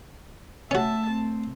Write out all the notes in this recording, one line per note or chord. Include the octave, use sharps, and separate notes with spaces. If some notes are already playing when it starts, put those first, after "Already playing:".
A3 C#4 F#4 E5 A5
C4